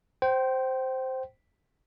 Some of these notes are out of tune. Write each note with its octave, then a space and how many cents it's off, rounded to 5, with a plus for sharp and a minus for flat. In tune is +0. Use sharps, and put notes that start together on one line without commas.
C5 +0 G5 -25